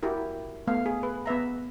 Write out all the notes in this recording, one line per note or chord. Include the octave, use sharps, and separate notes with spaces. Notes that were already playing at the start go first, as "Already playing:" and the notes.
E4 F#4 G4 A#4
A3 B3 F5
G#4
B4
B3 B4 E5 A#5